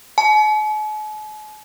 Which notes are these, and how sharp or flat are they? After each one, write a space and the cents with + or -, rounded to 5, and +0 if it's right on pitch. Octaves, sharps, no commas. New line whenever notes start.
G#5 +45